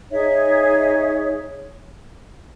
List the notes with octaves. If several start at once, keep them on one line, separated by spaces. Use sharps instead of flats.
D#4 G#4 C#5 E5